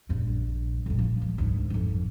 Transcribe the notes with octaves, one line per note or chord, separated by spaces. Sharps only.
A#1 G2
F2 A#2
F3
G#3
D2 G#2
G#1 F2